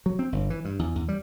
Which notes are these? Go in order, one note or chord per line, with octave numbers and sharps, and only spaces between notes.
F#3
C4
G1
E3
G2
E2
E2
G3